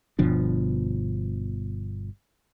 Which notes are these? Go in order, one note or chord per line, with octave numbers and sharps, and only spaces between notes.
G1 B2 F3 D4